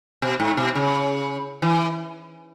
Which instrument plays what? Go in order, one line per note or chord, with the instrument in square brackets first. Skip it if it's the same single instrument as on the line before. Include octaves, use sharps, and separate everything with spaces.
[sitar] B2
G#2
B2
C#3
E3